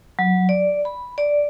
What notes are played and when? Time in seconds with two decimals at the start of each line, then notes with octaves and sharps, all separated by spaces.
0.19 F#3
0.49 D5
0.85 B5
1.18 D5